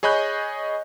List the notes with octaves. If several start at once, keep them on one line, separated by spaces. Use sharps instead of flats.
G#4 C#5 D#5 B5 F#6 G6